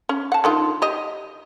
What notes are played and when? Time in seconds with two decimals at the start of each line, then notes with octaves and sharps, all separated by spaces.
0.09 C#4
0.32 F#5 A5
0.44 D3 D#3 F4
0.82 G4 D#5